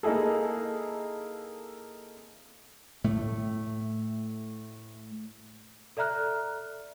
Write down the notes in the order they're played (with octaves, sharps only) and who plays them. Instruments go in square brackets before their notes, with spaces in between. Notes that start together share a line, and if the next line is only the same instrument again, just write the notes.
[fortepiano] A#3 D#4 E4 G#4 A4
[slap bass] A2 A3
[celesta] A4 D5 E5 A#5 F6 F#6